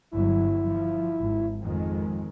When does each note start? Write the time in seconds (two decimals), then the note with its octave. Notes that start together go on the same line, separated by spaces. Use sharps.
0.11 G1 F#3 E4
0.71 F3
1.19 G#1
1.61 F2 D#3 G#3